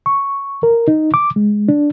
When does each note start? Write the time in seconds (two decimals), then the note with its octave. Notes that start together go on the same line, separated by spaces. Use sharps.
0.06 C#6
0.63 A#4
0.88 D#4
1.14 D6
1.36 G#3
1.69 D4